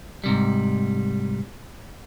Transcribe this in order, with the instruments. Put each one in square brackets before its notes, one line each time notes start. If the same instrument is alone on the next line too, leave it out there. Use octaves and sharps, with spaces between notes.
[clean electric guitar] G#2 C3 G3